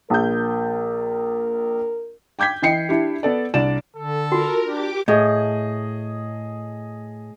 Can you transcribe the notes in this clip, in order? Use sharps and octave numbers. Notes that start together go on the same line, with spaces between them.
A#1 A#4 G6
G5 D6 G6 G#6 B6
E3 D#5 G5 C7 C#7
D4 E4 G4
B3 A4 D5
C2 D4 D5 E7
D3 A4
F4 F#4 A#4
D4 G4 D6
A2 G#4 D#5